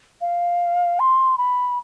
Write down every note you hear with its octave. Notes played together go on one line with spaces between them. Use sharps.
F5
C6
B5